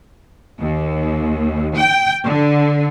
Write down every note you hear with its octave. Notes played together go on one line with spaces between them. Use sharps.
D#2
G5
D3